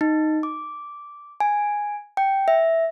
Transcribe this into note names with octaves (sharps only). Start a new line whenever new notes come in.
D#4
D6
G#5
G5
E5